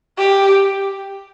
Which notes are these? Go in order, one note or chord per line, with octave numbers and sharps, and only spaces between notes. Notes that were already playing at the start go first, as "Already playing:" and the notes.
G4